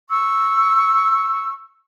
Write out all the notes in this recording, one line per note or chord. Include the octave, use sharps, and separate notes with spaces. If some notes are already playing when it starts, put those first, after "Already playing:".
C#6 E6